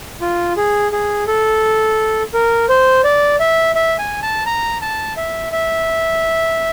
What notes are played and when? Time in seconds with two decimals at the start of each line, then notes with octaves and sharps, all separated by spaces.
0.21 F4
0.57 G#4
0.92 G#4
1.27 A4
2.34 A#4
2.69 C5
3.04 D5
3.40 E5
3.75 E5
3.99 G#5
4.23 A5
4.46 A#5
4.82 A5
5.17 E5
5.52 E5